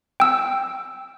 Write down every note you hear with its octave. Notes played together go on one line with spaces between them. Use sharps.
G5 E6